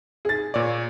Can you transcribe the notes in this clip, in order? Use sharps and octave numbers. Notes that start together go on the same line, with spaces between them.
G#4 A6
A#2 C#5 D5